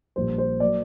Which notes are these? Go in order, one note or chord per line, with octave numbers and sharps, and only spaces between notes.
A#1 A#2 G3 C5
C5
F#3 A#3 D5